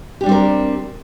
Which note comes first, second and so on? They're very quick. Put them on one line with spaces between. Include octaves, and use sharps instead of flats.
G4 D4 G3 C4 A#4